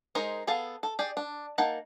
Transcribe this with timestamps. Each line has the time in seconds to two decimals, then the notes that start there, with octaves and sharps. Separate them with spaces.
0.15 G#3 D#4 A#4 C5
0.47 B3 G#4 A4 F5 A5
0.83 A4
0.99 G4 G#4 D5
1.17 D4
1.58 A#3 D#4 F#5 A5